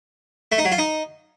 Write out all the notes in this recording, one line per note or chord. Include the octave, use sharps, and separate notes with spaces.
A3
D#4
F#3
F4
D#4